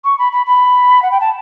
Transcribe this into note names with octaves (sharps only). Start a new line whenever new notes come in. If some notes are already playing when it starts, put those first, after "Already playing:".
C#6
B5
B5
B5
F#5
G5
A5